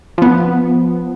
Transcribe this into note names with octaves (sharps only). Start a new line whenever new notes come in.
F3 B3